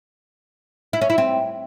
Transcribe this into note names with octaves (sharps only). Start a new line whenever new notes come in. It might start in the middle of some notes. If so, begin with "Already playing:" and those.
E4
C#4
E4
C4